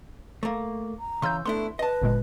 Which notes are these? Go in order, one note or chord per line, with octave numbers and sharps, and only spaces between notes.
A3 A#3
A#5
C#3 E3 C6 E6 G6
A3 B3 D4 E4 C6
B4 D#5 A5
G1 A#2 G#3